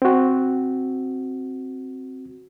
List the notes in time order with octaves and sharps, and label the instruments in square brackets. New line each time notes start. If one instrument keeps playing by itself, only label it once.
[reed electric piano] C4 F#4